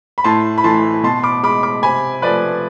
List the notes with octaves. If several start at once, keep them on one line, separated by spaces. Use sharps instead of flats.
B5
A2 A5 C6
B5
E3 A3 A5 C6
B2 A5 C6
B5 D6
G#3 B5 D6
B5 D6
C3 G#5 B5
F3 A3 B4 D5